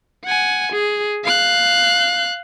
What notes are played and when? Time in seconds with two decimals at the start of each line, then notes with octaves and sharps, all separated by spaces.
0.25 F#5 G#5
0.72 G#4
1.25 F5 F#6